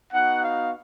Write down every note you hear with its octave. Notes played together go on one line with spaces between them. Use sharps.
B3 D#4 F#4 F#5
F5